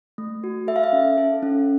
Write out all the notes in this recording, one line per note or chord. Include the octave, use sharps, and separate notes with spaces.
A3
F#4
A4 E5
F5
E5
C#4
A4
C#4